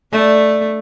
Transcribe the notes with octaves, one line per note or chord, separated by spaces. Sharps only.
A3 D4 D5